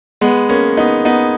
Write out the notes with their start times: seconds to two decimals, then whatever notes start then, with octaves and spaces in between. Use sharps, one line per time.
0.21 G#3 B3
0.49 A#3 C#4
0.77 B3 D#4
1.05 B3 D#4